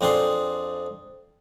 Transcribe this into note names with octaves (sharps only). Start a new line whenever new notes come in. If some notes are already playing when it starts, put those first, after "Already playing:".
F2 C4 D4 G#4 C6